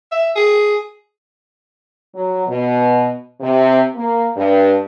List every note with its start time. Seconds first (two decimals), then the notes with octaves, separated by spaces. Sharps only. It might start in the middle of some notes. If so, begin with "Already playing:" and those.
0.12 E5
0.36 G#4
2.14 F#3
2.48 B2
3.41 C3
3.95 A#3
4.36 G2